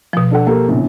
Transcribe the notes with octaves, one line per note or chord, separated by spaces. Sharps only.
B2 F3
D4 A4 F#5
A#3 G4 A4
A#1 E2 C#3